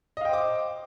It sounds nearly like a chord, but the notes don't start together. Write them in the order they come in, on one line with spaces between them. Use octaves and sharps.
D#5 F5 G5 C5 D6